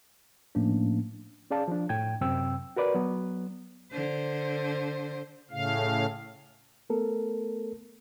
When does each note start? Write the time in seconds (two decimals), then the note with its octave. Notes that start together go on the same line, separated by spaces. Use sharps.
0.55 A2 F3 A3 A#3 C#4 D4
1.51 C#4 G#4 D5 F5 A5
1.68 F3 D4
1.89 A2 G5 G#6
2.21 F#2 C3 C4 G5 E6
2.77 F#4 A#4 B4 D5
2.95 F#3 B3
3.92 D3 C5
5.51 A2 C#3 F5
6.90 A3 B3 A4 A#4